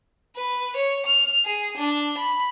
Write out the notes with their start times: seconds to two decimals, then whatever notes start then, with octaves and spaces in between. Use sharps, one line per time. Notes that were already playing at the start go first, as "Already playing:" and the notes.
0.36 B4
0.76 C#5
1.06 F6
1.45 G#4
1.77 D4
2.17 B5